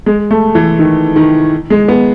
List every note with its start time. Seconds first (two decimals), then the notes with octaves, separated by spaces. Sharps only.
0.06 G#3
0.31 A3
0.55 E3
0.79 D#3
1.16 D#3
1.70 G#3
1.88 B3